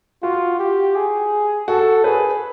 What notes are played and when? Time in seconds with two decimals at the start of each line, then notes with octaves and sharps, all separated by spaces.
0.23 F4 F#4
0.59 G4
0.96 G#4
1.68 F#4 A4
2.04 G#4 B4